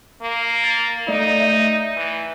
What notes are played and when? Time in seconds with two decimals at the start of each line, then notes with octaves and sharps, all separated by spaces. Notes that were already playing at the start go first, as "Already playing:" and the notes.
0.22 A#3
0.64 A6
1.08 A3 D#4 D5
1.40 E5 G6
1.97 E3